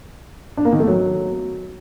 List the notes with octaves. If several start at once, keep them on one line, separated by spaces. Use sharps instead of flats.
D4
A#3
D#3
A3
F#3